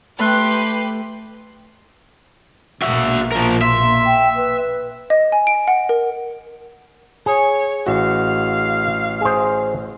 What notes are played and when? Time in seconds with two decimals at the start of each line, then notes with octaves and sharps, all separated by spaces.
0.19 A3 G4 B4 C6 F#6
2.82 A#1 B2 A#3 F#4 E5
3.32 F3 A#4
3.62 E5 C6
4.06 G5
4.36 B4
5.10 D#5
5.32 G#5
5.47 D7
5.68 F#5
5.89 A#4
7.26 G#4 C#5
7.87 A1 F#4 F5
9.21 G#4 C5